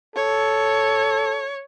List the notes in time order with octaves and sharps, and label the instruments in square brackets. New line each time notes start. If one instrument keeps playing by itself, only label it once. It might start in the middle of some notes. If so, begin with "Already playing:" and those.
[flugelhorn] A4 [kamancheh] C#5